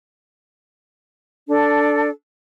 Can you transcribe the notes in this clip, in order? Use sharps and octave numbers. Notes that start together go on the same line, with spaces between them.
D4 A4